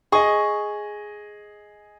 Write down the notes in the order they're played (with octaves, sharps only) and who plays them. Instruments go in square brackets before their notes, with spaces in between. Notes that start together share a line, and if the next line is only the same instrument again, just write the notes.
[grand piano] G#4 D#5 [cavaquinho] C#6 D#6